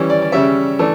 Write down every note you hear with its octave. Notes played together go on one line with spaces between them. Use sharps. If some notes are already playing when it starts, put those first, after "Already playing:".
Already playing: E3 G3 C#4
D5
D5
C#3 G3 C#4 E5
E3 A3 D4